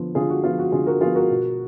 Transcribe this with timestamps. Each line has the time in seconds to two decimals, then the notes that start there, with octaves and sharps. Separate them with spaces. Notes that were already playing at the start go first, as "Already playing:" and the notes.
Already playing: D3 F3 B3
0.15 D3 F4 G#4
0.30 F#4
0.43 F3 B3 F4
0.59 F#4
0.72 D3 F4 G#4
0.86 F#4 A#4
1.01 F3 B3 F4 G#4
1.15 F#4 A#4
1.30 B2